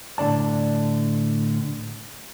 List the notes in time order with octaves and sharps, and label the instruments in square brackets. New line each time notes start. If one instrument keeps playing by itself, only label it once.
[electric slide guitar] A2 D3 D5 A5